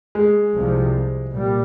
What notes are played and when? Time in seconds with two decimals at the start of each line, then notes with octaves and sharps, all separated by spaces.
0.15 G#3
0.55 C2 C3 F3
1.33 A#2 G3